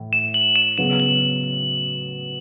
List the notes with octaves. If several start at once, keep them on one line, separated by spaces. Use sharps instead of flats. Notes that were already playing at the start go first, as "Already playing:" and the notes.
Already playing: A2 E3
E7
F#7
E7
C#3 F#3 B3 F#4 E7
F#7